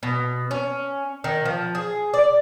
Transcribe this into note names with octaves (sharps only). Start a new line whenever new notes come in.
B2
C#4
D#3
F3
G#4
D5